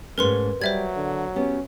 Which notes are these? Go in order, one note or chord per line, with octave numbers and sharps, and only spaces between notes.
G#2 A3 C#4 A#4 B4 C6
F#3 G3 C5 D5 E5 G#6
D3
B3 C#4 G4